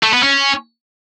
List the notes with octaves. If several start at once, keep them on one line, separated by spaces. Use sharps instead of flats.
A3
B3
C#4